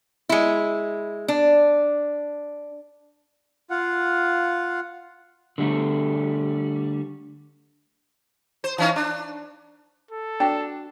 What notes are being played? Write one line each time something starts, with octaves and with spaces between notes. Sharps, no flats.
G#3 E4
D4
F4 F5 F#5
D3 G3 A3
C5
E3 C#4 D#4
D4
A4
D4 F#4 G5